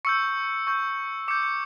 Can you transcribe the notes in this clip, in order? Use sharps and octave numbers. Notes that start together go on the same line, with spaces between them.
C#6 E6 G6 C#7
C#6 G6
D6 G6 C#7
C#7